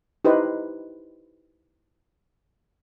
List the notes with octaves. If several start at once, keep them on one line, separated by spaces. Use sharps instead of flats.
D#4 E4 G4 B4 C5 D#5